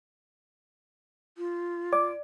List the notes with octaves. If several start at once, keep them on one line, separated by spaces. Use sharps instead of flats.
F4
D5 D6